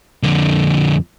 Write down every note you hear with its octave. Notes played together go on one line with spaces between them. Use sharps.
F2 D3